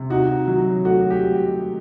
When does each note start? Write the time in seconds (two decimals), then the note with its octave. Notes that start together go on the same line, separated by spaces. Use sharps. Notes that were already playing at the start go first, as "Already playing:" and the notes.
Already playing: C3
0.10 D#4 F#4
0.48 F#3
0.85 A3 F#4
1.10 G4